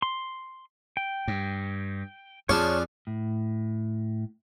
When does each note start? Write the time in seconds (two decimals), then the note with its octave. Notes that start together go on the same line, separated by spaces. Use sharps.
0.02 C6
0.97 G5
1.28 G2
2.49 F2 D4 F4 G#4 C#5 A5
3.07 A2